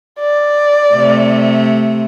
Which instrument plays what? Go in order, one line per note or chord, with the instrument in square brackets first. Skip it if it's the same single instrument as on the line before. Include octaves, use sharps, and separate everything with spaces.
[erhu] D5
[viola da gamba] C3 A3